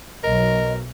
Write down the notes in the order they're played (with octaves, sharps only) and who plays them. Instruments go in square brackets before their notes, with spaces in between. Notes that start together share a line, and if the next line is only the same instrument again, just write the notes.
[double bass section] B1 F#3 [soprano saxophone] A#4 [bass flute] D#5